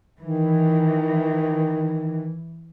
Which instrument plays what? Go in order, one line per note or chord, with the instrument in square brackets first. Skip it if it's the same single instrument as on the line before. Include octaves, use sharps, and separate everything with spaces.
[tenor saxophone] D#3 [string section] E3